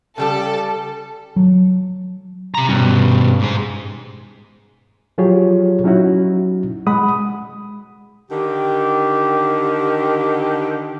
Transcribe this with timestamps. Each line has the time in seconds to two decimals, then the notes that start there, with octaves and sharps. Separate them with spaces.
0.18 C#3 G3 G4 A4
1.36 F#3
2.55 C3 A#5
2.69 G2 B2 C#4
3.39 G#2 G#4
5.18 F3 F#3 F4 G4 G#4 C#5
5.84 F#3 C#4 D#4 E4 F#4
6.87 G#3 F#5 B5 D#6
8.30 D3 D#3 G4